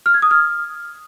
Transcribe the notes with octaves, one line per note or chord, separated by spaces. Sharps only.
F6
G#6
D#6
F6